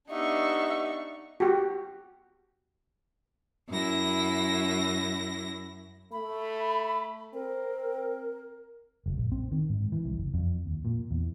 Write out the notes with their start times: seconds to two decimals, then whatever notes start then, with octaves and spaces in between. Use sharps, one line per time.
0.10 B3 D4 D#4 G4 E5 F#5 C#6
1.40 F#4 G4
3.68 F#2 E4 A#6
6.12 A3 B5
7.34 C4 A#4
9.06 F#1
9.18 A#1
9.32 C4
9.51 D#3
9.70 G#2
9.92 E3
10.05 C2
10.17 F#1
10.34 F2
10.66 D#2
10.85 A#2
11.11 E2